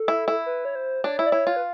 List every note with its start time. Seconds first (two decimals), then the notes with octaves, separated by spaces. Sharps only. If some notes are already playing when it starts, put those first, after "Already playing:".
Already playing: A4
0.08 E4
0.28 E4
0.46 B4
0.65 C#5
0.75 C5
1.04 D4 C#5
1.19 E4
1.26 D5
1.32 E4 C#5
1.47 F4
1.56 B4